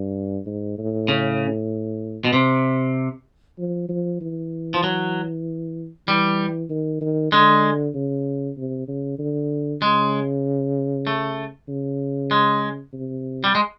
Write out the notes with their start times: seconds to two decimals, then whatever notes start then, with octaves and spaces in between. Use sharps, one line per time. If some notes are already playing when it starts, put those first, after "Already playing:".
Already playing: G2
0.46 G#2
0.78 A2
1.08 C#3
2.25 B2
2.33 C3
3.59 F3
3.89 F3
4.21 E3
4.74 F3
4.83 F#3
6.08 E3 G3
6.70 D#3
7.01 D#3
7.32 D3 G#3
7.94 C#3
8.57 C3
8.88 C#3
9.19 D3
9.81 C#3 G#3
11.07 A3
11.68 C#3
12.31 G#3
12.93 C3
13.44 G3
13.55 G#3